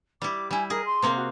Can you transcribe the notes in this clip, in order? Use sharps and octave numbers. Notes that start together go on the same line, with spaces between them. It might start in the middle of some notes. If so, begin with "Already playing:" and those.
G3 E4 D6
G3 E4 G#5
G#4 A#4 D#5
C6
C3 A#3 C4
F#4